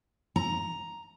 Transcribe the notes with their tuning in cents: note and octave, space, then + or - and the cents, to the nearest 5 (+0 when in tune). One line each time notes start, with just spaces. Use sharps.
A#5 +5